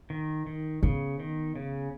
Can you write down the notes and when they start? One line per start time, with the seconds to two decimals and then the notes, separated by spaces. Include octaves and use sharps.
0.10 D#3
0.47 D#3
0.83 C#3 B3
1.20 D#3
1.56 C#3